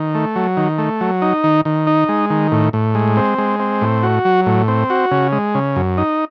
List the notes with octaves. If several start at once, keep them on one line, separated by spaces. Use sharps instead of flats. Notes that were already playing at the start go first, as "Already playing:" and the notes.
Already playing: D#3
A3
F#3
D#3
A3
F#3
D#4
D#3
D#3
D#4
G#3
D#3
A2
A2
G#3
C4
G#3
C4
A2
F#4
F#3
A2
C4
F#4
C#3
G#3
C#3
F#2
D#4